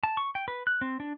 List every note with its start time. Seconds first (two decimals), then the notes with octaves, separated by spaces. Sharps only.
0.04 A5
0.17 C#6
0.35 G5
0.48 B4
0.67 F#6
0.81 C4
1.00 D4